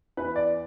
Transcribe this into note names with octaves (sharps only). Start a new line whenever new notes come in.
E2 E3 B4
D5